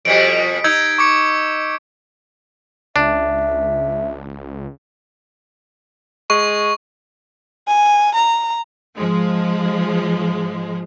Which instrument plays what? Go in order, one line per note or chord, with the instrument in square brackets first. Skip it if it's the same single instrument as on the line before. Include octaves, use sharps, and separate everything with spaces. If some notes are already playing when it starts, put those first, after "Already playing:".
[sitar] F2 B2 G3 [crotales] B6 C#7 D7
[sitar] D#4 [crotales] E6 G6 G#6
[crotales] C#6 D6 C#7
[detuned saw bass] C#2 [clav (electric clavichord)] D4 [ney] E5
[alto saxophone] G#3 [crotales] C#6
[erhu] G#5
A#5
[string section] G#2 F3 G#3